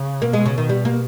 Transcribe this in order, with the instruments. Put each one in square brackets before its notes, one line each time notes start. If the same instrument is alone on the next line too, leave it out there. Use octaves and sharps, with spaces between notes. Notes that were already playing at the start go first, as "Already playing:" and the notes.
Already playing: [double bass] C#3
[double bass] B2 [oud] A#3
[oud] G#3
C#3
D#3
G3
A#3